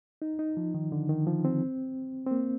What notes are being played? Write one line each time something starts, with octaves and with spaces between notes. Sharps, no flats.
D#4
D#4
F3
D#3
D3
D#3
F3
C4
C4
A#3